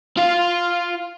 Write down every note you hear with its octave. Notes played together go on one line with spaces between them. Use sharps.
F4 F5